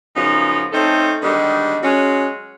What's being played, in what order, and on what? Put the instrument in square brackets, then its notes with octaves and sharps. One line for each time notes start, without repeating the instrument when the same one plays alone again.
[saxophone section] F#2 C#3 F3 B3 D#4
A3 C4 C#4 D#4 A4
D3 D#3 G3 G#3 B3
F#3 G#3 C#4